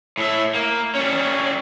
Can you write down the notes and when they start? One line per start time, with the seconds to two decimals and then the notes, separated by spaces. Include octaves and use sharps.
0.18 A2 E5
0.55 A#3
0.95 G3 C#4